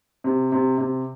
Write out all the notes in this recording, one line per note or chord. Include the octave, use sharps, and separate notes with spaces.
C3
C3
C3